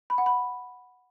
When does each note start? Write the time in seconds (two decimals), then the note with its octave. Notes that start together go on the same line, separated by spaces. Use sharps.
0.10 B5
0.18 F#5
0.26 B5